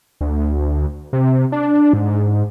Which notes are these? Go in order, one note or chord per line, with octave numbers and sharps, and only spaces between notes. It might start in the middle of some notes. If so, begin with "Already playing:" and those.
D2
C3
D4
G#2